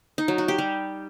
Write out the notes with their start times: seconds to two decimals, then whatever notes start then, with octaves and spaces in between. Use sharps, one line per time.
0.18 D#4
0.28 F#3
0.38 F#4
0.48 G4
0.58 G3